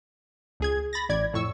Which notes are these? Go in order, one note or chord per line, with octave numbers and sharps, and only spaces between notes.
C#2 G#4 G#6
B5 A6 A#6
A1 A2 D5 G#6
F2 A2 C#6 E6